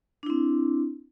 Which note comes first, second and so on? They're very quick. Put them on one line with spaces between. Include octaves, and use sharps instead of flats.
D4 E4 C4